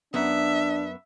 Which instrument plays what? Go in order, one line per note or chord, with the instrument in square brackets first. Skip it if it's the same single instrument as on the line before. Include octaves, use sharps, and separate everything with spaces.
[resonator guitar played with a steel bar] F#2 B3 [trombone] D4 [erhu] E5